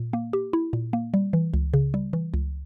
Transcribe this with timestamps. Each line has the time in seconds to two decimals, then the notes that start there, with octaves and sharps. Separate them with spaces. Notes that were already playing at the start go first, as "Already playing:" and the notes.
Already playing: A#2
0.13 A#3
0.33 G4
0.53 E4
0.73 A#2
0.93 A#3
1.14 G3
1.33 E3
1.54 C#2
1.74 C#3
1.94 G3
2.13 E3
2.34 C#2